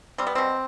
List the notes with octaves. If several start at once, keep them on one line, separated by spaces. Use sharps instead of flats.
G3 C4
B3
B2 C4